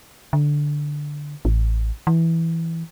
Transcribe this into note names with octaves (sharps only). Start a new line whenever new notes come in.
D3
A1
E3